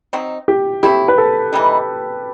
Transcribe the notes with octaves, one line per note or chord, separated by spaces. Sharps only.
F#3 C4 D#4
G4
A3 C4 E4 G4
B4
A4
E3 G3 D#4